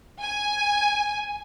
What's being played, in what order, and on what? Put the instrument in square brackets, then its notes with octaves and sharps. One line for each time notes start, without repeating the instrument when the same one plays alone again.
[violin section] G#5